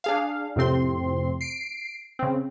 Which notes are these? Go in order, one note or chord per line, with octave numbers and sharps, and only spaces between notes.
D4 G#4 F5
F2 A2 C3 C4 C6
C7 D7
C#3 C4